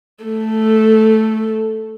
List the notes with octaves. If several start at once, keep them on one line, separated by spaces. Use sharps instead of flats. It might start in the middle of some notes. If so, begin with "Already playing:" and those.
A3 A4